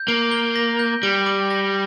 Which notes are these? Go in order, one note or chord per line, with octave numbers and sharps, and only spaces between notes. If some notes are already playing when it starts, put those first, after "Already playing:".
Already playing: G6
A#3 D7
G7
A#6
G6
G3 D7
D6
A#6